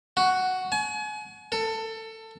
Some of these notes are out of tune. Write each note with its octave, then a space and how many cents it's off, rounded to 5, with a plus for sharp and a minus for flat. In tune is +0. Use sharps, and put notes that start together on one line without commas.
F#4 +5
G#5 +35
A4 +20